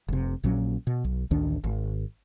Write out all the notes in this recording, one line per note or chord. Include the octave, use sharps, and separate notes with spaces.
F1 C3
A#1 A#2 F#3 C#4
B2
B1
A1 D2 D#3 D4
G#1